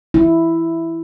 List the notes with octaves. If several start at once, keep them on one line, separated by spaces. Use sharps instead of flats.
E4